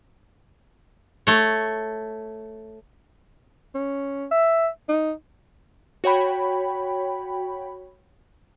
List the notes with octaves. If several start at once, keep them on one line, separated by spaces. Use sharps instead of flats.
A3 C#5
C#4
E5
D#4
F#4 C#5 G5 B5